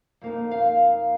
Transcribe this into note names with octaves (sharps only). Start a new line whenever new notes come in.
F2 F3 A#3 D#4
F5